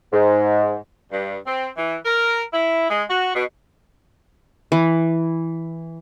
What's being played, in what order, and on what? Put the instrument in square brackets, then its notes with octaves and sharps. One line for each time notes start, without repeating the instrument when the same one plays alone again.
[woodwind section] G#2
[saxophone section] G2
C4
E3
A#4
E4
G#3
F#4
B2
[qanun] E3